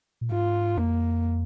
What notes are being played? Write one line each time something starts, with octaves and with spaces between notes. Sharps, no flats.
A#2
G#2 F4
F2 A#3